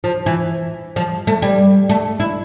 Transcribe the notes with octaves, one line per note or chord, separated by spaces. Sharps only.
F3
E3
F3
A3
G3
A3
E4